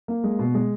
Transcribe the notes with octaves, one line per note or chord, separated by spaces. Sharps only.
A#3
G#3
B2
G#3